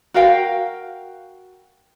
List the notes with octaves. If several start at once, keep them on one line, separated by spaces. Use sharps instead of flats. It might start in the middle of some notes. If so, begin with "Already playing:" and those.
F#4 A#4 F5 G5